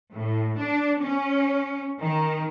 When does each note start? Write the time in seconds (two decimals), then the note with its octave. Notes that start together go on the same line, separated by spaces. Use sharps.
0.13 A2
0.58 D4
1.01 C#4
2.01 D#3